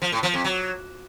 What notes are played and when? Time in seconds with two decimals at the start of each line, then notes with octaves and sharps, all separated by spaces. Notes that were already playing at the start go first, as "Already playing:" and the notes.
0.02 F3
0.12 A2
0.23 F3
0.34 F2
0.44 F#3